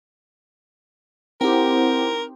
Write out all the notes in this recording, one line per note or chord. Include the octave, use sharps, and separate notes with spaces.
C4 D#4 E4 G4 A#4 C5 F#5